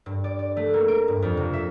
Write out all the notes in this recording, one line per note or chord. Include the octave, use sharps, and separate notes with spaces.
G2
D5
D5
A3
A#3
D7
G2
F2
C3
E5